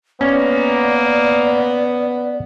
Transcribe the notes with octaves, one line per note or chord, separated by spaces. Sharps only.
A#3 B3 C#4 D5